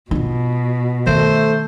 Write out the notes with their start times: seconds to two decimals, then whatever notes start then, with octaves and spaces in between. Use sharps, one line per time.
0.11 B2 E4 F4
1.07 D#3 A3 C5